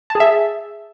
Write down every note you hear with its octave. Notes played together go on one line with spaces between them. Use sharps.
A5
G#4
E5